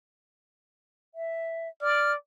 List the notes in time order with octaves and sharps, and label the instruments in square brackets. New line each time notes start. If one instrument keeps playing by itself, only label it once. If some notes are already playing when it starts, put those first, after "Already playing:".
[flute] E5
[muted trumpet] D5 [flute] F6